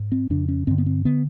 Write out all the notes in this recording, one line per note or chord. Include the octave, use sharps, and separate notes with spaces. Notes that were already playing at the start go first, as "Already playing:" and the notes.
Already playing: G#2
C4
F2 C#3 D4
C#4
G2 D3 C4
B3
C4
D3 B3